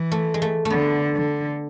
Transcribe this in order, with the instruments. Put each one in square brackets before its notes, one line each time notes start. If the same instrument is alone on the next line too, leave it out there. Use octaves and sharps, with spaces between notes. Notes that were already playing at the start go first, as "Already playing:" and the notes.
Already playing: [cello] E3
[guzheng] A3
G#3
A3
A3
[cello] D3 [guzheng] B3
[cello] D3